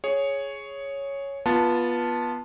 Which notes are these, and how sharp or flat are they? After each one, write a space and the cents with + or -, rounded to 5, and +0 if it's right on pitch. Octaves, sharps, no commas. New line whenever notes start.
G#4 +0 C#5 +0
B3 -20 F4 +0 A5 +0